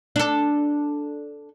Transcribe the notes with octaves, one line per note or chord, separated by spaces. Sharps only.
D4 A4